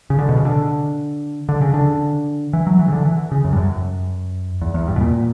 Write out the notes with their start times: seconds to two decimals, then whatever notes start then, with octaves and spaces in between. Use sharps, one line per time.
0.10 C#3
0.19 D3
0.29 B2
0.37 C#3
0.45 D3
1.49 D3
1.61 C#3
1.74 D3
2.53 E3
2.67 F#3
2.79 E3
2.88 C#3
2.92 D3
3.05 E3
3.32 C#3
3.44 F#2
3.53 G2
3.57 F#2
4.61 E2
4.74 E2
4.88 G2
4.96 B2
5.01 A#2